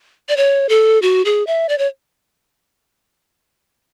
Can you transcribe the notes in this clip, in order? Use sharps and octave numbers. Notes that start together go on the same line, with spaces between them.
D5
C#5
A4
F#4
G#4
E5
D5
C#5